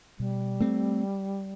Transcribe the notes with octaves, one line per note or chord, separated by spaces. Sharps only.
B2 G3
A3 C4